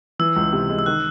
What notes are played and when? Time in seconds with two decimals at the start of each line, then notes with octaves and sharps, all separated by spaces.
0.19 E3 E6
0.36 C#2
0.53 C3
0.70 G#3
0.79 E6
0.86 D#3 F#6